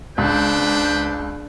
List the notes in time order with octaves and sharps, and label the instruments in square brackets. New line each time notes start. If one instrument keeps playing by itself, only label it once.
[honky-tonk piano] C#2 [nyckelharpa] D4 [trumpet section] B4 C5 G5